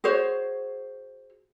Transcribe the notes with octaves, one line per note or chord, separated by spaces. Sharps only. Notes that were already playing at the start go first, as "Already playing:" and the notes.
F#4 G#4 C5 C#5